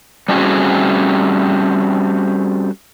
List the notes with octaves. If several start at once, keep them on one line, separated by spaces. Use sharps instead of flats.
G3 A3 C4 C#4 F#4 G#4